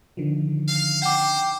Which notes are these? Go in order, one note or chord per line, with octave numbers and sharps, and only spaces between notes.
D3 D#3 F3
F5
C5 F#5 G5 D6